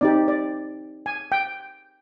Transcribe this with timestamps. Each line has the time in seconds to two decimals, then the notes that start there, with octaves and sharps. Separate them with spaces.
0.01 C4 D#4 G4 D5
0.28 D5
1.06 G#5
1.32 G5